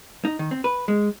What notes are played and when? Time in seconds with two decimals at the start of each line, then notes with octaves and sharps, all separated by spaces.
0.25 D#4
0.39 D#3
0.51 C4
0.64 B4
0.88 G#3